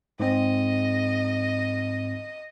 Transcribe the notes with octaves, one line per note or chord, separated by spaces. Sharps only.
G#2 C4 D#5